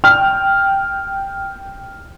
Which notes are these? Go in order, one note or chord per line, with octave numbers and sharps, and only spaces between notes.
G5 F6